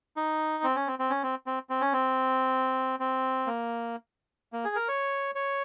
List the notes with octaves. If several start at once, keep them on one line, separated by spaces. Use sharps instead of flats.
D#4
C4
C#4
C4
C4
C#4
C4
C4
C4
C#4
C4
C4
A#3
A#3
G#4
A#4
C#5
C#5